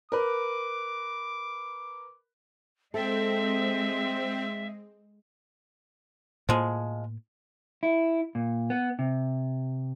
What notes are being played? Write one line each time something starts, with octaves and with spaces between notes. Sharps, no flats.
A#4 B4 D6
G#3 C4 A4 E5
A2 F3 G#3 A#3
E4
A#2
B3
C3